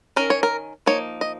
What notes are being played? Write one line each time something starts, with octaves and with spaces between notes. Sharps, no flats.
D#3 C#4 A#4
C#5
A#4
F3 A#3 D#4 C#5
D#5